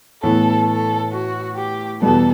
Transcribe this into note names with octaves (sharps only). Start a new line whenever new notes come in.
A2 E3 B3 A4
A4
F#4
G4
E2 B2 G3 B3 A4